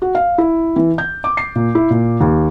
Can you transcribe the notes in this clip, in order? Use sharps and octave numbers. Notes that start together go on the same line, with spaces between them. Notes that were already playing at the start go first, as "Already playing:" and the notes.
F#4
F5
E4
E3
G6
D6
C7
A#2
E4
A#2
D#2